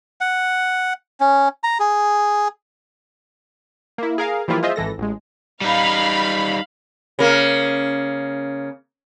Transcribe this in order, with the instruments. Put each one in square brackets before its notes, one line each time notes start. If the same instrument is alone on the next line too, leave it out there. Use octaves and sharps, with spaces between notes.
[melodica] F#5
C#4
A#5
G#4
[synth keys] A#3 E4
G#4 A#4 F5
E3 F3 G3 A#3 E4 F4
F4 G#4 C5 D#5 E5
G#1 E3 A4 A#6
A1 G#3
[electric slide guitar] G3 D#4 [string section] F5 B5
[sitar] C#3 A#3